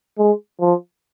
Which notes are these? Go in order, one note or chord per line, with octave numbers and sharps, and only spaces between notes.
G#3
F3